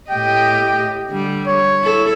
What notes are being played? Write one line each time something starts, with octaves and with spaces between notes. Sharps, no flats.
A2 G4 D#5 G5
D3 G3
C#5
E4 A4